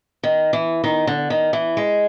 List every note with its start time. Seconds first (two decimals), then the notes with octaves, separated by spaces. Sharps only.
0.23 D#3
0.53 E3
0.84 D#3
1.07 D3
1.30 D#3
1.53 E3
1.77 G#3